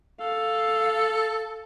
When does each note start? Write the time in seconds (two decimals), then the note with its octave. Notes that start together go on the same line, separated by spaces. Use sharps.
0.20 A4 F5